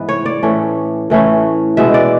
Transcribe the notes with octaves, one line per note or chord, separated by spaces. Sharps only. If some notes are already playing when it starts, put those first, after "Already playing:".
Already playing: G#2 E3 B3
C#5
D5
A2 E3 A3 C#4
A2 E3 A3 C#4
B2 G#3 B3 E5
D5